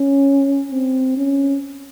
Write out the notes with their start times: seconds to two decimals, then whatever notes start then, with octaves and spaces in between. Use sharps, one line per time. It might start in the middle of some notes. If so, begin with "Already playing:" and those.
Already playing: C#4
0.71 C4
1.17 C#4